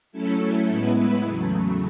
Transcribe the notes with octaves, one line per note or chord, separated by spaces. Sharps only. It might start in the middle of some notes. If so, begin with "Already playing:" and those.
F#3 A3 C#4 E4 A4
A2 G#3 B3 E4 B4
E2 C#3 F#3 A3